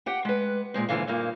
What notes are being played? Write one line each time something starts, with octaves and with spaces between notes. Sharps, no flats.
G4 F#5 G5
G#3 B4
A#2 G#3 C4
D#2 G#2 B2 D3 E3 F5
G2 A#2 A#3 D#4